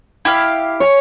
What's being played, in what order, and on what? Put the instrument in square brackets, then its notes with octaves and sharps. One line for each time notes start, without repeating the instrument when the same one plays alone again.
[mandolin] E4 G4 F5
[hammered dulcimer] C#5 G#5